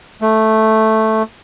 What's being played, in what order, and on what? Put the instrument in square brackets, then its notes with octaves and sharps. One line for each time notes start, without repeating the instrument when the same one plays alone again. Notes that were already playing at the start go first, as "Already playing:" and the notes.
[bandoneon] A3